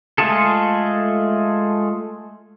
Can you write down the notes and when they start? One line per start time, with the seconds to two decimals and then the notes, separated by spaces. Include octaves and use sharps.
0.18 G#3 A3 F4 G#4 A4